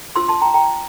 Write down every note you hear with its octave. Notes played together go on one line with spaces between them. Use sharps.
D4 F4 C5 C6 E6
A5 C6
G5 A#5
G5 A#5